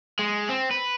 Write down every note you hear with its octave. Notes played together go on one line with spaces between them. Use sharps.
G#3
C4
B4